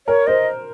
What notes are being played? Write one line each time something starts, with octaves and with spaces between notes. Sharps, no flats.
A#4 C#5
C5 D#5